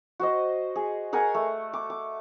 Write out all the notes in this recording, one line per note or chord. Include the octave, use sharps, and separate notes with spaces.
F#4 C5 D#5
G#4
G#4 A#4 F#5 G#5
A3
D6
D6